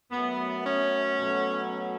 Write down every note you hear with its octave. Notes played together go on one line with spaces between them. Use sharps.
F#2 F#3 A3 B3
C#4
B2 F#3 A3